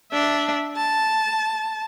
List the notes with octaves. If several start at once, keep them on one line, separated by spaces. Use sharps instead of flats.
D4 E5
A5